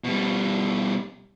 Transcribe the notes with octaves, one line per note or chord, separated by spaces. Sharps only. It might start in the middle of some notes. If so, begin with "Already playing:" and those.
B2 G3